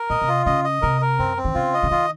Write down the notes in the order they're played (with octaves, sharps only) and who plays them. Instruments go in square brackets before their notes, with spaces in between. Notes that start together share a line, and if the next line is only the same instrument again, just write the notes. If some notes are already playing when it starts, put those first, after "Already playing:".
Already playing: [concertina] A#4
[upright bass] A#2 [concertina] D#5
[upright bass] C3
[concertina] F4
[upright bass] C#3 [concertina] D#5
[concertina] D#5
[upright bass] C3 [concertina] A#4
[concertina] A#4
[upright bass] F#2 [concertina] C4
[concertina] C4
[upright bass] D#3
[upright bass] C#3 [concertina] F4
[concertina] D#5
[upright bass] C#3
[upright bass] D#3 [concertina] F4